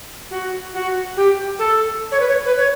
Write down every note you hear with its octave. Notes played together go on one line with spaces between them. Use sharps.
F#4
F#4
G4
A4
C#5
B4
C#5
B4
C#5